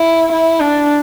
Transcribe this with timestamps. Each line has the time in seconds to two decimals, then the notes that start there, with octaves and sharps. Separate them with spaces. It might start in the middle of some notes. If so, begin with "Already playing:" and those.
Already playing: E4
0.32 E4
0.60 D4